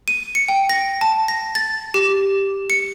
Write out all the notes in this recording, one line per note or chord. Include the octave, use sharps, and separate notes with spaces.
D#7
C#7
G5
A#6
A5
A#6
A6
G4
C#7